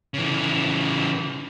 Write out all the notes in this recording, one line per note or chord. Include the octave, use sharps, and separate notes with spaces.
C#3 E3